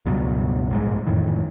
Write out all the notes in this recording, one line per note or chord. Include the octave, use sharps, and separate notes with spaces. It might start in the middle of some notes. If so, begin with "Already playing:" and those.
C#2 G2 B2 F#3
A#1 G#2 G#3
F2 A2 D#3 E3